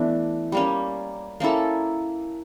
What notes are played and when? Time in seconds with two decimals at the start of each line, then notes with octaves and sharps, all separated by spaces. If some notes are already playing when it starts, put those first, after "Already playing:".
Already playing: E3 A3 B3 D4
0.52 G3 A#3 C#4
1.40 A#3 C#4 E4 A4